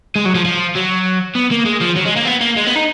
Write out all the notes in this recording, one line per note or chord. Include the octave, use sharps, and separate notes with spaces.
G#3
F#3
F3
F3
F#3
B3
A#3
G#3
F3
F#3
G#3
A#3
B3
A#3
G#3
B3
D#4